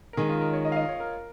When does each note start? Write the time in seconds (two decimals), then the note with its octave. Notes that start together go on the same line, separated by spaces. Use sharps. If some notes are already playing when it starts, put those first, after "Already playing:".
0.13 A#4
0.17 D#3 G#3 C#4 G#4
0.29 F4
0.41 A#4
0.53 C#5
0.65 D#5
0.72 F5
0.76 D#5
0.88 C#5
1.00 A#4